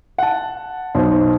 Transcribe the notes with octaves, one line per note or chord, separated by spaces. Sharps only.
F#5 A5
B1 C5